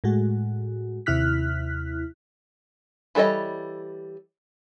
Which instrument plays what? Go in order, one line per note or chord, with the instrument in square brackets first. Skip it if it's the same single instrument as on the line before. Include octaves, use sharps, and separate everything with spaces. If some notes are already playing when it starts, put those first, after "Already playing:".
[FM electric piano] A2 G#3 F#4
D#2 C3 E4 F6 F#6 B6
[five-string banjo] E3 G3 A4 C#5 D#5